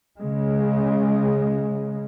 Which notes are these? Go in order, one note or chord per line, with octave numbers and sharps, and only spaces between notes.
C#3 G#3